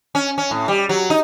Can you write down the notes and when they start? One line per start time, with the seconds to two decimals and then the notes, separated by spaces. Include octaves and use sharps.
0.15 C#4
0.38 C#4
0.51 A2
0.68 G3
0.89 F#3
1.10 D#4